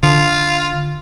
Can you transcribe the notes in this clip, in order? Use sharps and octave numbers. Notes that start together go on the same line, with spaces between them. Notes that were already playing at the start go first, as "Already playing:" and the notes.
D3 F4